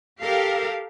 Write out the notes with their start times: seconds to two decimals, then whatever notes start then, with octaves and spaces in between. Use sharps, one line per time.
0.21 G4 A4 A#4 F5